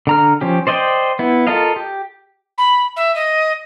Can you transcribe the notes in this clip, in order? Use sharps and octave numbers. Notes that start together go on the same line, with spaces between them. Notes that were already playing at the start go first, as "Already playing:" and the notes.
D3 A#5 F6
F3 C#4 G4
C5 D5 D#5 F5 G5
B3 E4
F4 A4 A#4 D#5 F5
G4
B5
E5
D#5